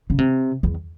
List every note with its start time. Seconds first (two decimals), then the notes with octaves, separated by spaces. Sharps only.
0.10 C#3
0.18 C3
0.63 E2